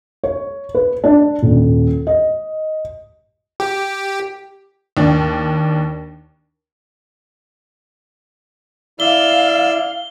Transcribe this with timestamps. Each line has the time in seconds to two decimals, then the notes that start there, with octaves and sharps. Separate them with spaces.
0.24 C#5
0.75 B4
1.04 D4
1.43 D#1
2.07 D#5
3.60 G4
4.97 D#2 D4
9.00 E4 D5 F5 E6 G7